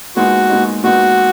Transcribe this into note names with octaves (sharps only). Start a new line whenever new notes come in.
A#2 G#3 B3 D#4 F#4
A#2 G#3 B3 D#4
A#2 G#3 B3 D#4 F#4